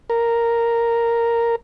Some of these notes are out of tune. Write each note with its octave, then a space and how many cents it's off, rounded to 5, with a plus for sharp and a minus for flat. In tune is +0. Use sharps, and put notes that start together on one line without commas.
A#4 -5